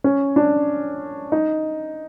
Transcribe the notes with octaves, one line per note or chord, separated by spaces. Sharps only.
C#4
D4
D#4